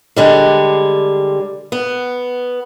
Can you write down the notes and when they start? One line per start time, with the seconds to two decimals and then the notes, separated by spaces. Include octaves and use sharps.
0.16 D3 G3 G#3
1.72 B3